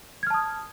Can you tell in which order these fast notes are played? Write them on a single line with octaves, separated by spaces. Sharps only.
G#6 F6 A5 D#6